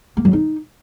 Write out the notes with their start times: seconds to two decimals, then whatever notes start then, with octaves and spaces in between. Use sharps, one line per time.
0.17 A#3
0.25 F#3
0.33 D#4